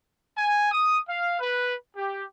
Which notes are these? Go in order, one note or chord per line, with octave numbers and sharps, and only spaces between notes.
G#5
D#6
F5
B4
G4